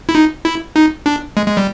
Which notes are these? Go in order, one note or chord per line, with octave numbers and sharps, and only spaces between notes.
E4
D#4
E4
D#4
D4
G#3
G#3
G3